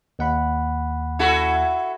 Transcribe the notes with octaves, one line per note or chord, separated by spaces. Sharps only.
D#2 F#5 B5
E4 F#4 A4